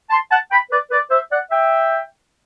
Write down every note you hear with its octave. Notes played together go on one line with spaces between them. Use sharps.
A5 C6
F#5 A5
G5 B5
B4 D5
B4 D5
C5 E5
D5 F#5
E5 G5